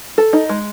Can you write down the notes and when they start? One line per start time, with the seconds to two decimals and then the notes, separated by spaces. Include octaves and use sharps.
0.18 A4
0.33 D#4
0.49 G#3